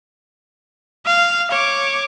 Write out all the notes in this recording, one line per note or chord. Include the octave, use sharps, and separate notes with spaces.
F5
C#5 D6